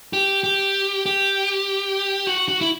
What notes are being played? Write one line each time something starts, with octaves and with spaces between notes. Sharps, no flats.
G4
G4
G4
F#4
F#4
E4